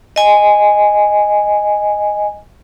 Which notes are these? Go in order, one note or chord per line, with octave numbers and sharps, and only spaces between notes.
D#5 G#5